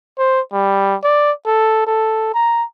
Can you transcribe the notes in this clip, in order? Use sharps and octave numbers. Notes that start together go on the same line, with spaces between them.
C5
G3
D5
A4
A4
A#5